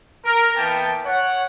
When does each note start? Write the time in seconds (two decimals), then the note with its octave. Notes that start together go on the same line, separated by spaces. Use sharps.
0.25 A#4
0.56 E3 A#3 B3 G5 A5
1.05 C#5 F#5